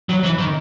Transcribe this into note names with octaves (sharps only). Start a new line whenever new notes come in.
F#3
E3
D#3